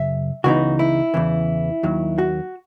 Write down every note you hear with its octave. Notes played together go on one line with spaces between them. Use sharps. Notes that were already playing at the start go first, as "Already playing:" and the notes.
Already playing: F#2 C#3 E5
C#2 C#3 E3 B3 D#4 F#4
E4
E2 C#3 E3
D#2 D#3 F#3
F#4